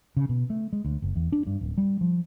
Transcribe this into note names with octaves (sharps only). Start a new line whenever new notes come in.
C#3
B2
A3
G#3
D2
F#1
E2
D4
G2
D1
G3
F3